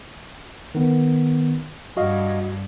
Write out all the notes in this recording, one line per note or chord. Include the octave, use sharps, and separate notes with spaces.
D#3 B3
G2 F#4 D#5 F5